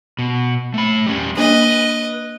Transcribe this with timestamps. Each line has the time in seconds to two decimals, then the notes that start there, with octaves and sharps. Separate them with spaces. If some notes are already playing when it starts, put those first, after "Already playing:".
0.19 B2
0.74 A3 B5
1.06 G3 C#4
1.37 A#3 D4 B4 D#5